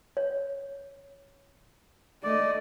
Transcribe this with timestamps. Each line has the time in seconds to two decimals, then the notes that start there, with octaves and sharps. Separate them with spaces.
0.17 C#5
2.23 A3 D5 D#5